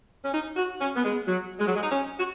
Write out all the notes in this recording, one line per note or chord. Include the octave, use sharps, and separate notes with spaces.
C#4
D#4
F#4
C#4
B3
G#3
F#3
G#3
F#3
G#3
D#4
C#4
F#4